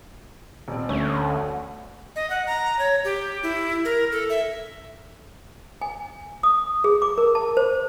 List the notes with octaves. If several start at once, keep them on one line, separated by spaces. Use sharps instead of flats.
D#1 C4
D2 A3 C#4
D#5
F#5
A#5
C#5
G4
E4
A#4
A4
E5
G#5
D#6
G#4
D6
A#4
A5
C5